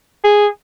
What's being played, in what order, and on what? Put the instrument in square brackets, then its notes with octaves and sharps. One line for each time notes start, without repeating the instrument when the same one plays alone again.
[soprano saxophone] G#4